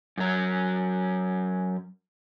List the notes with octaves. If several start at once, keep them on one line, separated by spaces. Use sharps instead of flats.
F#2 F#3